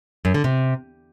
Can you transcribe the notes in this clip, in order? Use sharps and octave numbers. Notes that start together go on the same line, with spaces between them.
F#2
D3
C3